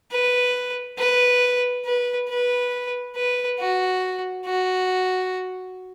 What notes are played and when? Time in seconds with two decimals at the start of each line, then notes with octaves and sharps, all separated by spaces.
0.11 B4
0.98 B4
1.85 B4
2.29 B4
3.16 B4
3.59 F#4
4.45 F#4